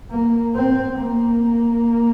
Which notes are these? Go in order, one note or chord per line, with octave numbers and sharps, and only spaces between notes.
A#3
C4
A#3